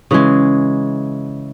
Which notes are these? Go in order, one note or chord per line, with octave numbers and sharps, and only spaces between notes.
C#3 E3 G#3